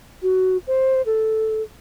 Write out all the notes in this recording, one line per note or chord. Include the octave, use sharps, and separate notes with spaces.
F#4
C5
A4